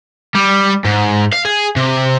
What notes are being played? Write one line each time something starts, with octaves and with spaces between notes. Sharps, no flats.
G3
G#2
F5
G#4
C3